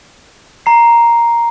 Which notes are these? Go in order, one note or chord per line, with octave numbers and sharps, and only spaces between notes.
A#5 C7